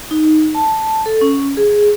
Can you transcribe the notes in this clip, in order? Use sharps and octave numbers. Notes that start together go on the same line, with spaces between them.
D#4
A5
A4
C#4
G#4